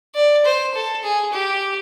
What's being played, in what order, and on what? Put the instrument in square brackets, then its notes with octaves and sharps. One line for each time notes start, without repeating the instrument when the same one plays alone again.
[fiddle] D5
C5
A4
G#4
G4